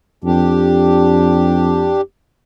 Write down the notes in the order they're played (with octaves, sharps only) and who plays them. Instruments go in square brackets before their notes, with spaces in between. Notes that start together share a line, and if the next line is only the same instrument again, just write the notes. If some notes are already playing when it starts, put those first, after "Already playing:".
[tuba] F2 [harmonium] D4 G4